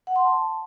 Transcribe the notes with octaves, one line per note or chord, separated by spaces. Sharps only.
F#5
C6
A5